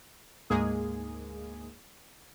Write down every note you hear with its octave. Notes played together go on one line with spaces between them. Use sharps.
D2 G#2 G#3 A#3 G#4